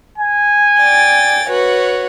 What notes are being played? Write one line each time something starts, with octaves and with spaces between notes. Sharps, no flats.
G#5
D5 G5 A6
F#4 B4 C#5